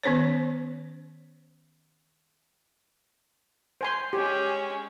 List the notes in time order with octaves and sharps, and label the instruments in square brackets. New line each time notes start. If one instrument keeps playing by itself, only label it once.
[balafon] D#3 B3 C#4 C5 C#5
[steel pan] C5 G#5 C6
[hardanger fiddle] G#3 C#4 [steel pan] G4